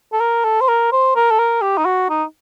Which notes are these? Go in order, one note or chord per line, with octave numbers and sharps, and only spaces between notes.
A4
A#4
A4
C5
A#4
C5
A#4
A4
A#4
G4
D#4
F#4
D#4